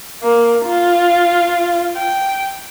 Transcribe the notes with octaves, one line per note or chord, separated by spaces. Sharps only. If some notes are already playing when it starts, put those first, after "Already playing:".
A#3
F4
G5